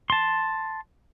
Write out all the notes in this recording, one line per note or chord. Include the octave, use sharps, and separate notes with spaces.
A5 C6